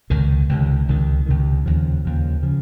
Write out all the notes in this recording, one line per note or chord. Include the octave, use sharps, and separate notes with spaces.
C#2 C3 D#3
C#2 C3 D#3
C#2 C3 D#3
C#2 C3 D#3
D#2 C#3 F3
D#2 C#3 F3
C#3 F3